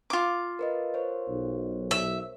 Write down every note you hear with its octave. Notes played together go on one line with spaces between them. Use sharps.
F4 D6
A#4 B4 D#5
A#4 C5 C#5
B1
E5